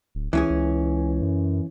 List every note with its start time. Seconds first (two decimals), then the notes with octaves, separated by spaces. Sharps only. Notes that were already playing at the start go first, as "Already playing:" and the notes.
0.15 D1
0.33 C#2 E3 C#4 G#4
0.50 C#2
1.22 F#2